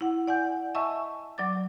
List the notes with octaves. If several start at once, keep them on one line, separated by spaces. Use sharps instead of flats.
E4 F#5
D5 F#5 G#5 G6
D#5 E5 G#5 A5 C#6 E6
F#3 D5 D6 A6